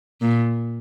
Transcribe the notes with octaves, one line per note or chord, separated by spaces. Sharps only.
A#2